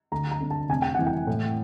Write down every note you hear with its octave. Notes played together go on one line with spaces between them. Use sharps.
D2 A#5
A#5
D3
A5
F1 G#5
G5
E3 F#5
G5
A2